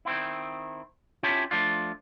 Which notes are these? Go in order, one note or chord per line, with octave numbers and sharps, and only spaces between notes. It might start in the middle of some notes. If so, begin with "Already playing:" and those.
D#3 C4 E4
C#4 E4 F4 G4 C#5 A5
F3 A3 D4 F4